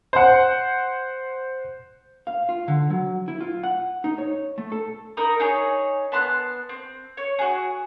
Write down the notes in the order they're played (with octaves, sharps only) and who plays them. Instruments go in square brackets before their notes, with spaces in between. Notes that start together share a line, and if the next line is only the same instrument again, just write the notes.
[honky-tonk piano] C5 F#5
[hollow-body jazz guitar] F5
F4
D3
F#3
E4
F4
F#5
D#4
C#5
A3
A4
[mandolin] D#4 A#4 B5 D#6
D#4 G#4 C#5
B3 A5 C6 F#6
C4
C#5
F#4 G#4